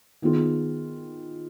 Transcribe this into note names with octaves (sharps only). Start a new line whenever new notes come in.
D#3 B3 F4 G#4